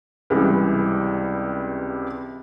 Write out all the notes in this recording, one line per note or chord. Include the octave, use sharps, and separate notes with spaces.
C#2 C3 E3 G3